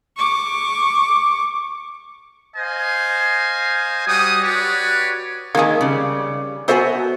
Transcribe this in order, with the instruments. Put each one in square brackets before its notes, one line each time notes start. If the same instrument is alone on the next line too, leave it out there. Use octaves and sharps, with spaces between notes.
[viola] C#6 D6
[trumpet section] C5 D#5 F5 G#5
G3 F#4 D#6
F#4 G4 B4 C#5 D5
[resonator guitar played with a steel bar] D#3 G#3 [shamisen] A#3 G#4
[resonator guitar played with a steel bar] C#3 G3
[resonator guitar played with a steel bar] B3 F#4 G#5 [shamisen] A4 C5 E5